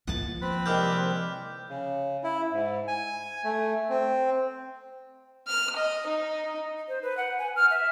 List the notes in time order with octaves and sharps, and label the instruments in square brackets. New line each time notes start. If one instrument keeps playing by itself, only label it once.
[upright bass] F3 A#3 [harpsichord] F#5 A5
[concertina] C4 B4
[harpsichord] C2 D#3 G#3 [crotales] D6 F6 G6
[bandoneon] C#3
E4
G#2
G#5
A3
C4
[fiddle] F6
D#5
D#4
[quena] C5
B4
F#5
G#5
F6
E5